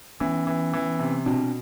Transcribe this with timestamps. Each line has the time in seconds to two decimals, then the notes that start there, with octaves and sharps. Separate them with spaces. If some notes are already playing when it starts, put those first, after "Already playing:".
0.20 E3 B3 C#4
0.47 E3
0.73 E3
0.99 C3
1.26 B2 C4 D4